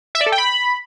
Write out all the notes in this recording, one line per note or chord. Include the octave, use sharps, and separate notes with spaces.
E5
D5
A4
G5
B5